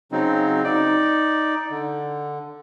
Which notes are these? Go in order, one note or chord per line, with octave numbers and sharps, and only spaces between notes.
C#3 F#3 C4 D#4
D#4 D5
D3